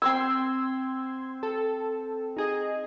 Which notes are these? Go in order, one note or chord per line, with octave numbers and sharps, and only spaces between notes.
C4 C5 C6 E6 G#6
A4
D#4 G#4 D#5